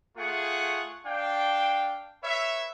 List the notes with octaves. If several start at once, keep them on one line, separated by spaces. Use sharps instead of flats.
A3 F4 G#4 F#5 C#6
D4 F5 G5
B4 C#5 E5